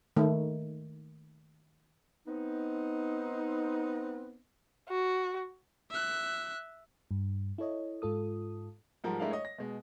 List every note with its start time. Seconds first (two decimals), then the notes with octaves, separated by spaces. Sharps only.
0.17 D#3 A3
2.28 B3 C4 D#4
4.89 F#4
5.90 E5 F#6
7.11 G2
7.58 E4 A4 C#5 D#5
8.02 G#2 F4 A4 D#6
9.04 G#2 F3 G3 A#4 F#5
9.20 G#3 A3 D4 E4 A#4 F5
9.31 C#5 D#5
9.45 A#6
9.58 B2 G#3